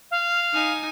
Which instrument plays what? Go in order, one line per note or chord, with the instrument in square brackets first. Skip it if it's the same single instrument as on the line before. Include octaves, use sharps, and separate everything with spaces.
[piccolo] F5
[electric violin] D#4 G#5